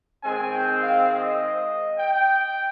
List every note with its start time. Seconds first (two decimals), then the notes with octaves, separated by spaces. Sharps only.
0.23 D#3 G#3 C4 G#5
0.52 G5
0.81 F5
1.11 D#5
1.99 G5